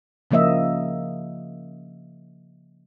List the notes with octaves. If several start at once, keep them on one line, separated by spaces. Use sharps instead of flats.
C#3 F3 A#3 D#5 E5